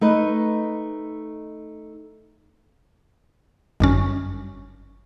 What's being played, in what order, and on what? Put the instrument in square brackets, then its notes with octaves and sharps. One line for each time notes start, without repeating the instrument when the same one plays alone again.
[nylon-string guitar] A3 D#4 B4
[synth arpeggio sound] G1 F#2 C#4